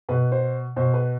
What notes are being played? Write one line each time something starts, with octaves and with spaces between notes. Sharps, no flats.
B2 B4
C5
B2 C5
B4